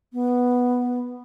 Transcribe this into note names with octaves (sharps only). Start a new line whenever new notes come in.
B3